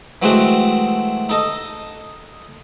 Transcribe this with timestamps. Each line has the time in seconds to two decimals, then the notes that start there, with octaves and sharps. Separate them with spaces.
0.22 E3 F#3 G#3 A3 C4 F#4
1.29 D#4 A4 D#5